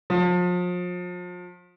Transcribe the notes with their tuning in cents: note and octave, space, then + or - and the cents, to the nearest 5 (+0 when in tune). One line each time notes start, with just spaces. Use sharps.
F3 +35